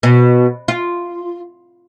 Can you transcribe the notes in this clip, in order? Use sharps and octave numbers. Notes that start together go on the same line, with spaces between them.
B2
F4